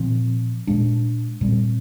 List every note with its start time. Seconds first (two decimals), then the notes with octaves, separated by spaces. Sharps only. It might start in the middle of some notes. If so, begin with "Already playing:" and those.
Already playing: A#2 F3 C4
0.67 A#2 G#3 D4
1.41 A#2 G3 C4